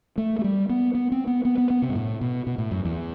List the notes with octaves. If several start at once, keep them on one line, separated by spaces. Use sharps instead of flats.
A3
A3
G3
B3
B3
C4
B3
B3
B3
B3
C3
G2
A2
B2
B2
A2
F#2
E2